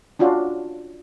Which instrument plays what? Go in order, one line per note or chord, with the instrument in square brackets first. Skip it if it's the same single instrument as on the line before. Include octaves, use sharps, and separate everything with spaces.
[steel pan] C#4 D4 F4 F#4